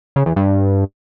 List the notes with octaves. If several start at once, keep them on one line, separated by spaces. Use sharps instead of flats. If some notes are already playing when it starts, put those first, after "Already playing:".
C#3
E2
G2